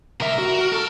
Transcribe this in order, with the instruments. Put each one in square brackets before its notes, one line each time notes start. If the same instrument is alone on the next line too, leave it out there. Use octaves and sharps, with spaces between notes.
[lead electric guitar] C2 E5 [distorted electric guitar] A#4
[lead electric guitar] F#4
A4